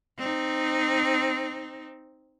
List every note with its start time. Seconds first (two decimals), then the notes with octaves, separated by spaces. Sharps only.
0.18 C4 D#4